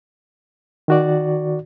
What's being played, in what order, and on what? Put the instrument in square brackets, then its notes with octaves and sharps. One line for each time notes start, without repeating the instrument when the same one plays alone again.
[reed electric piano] D#3 F#4 D5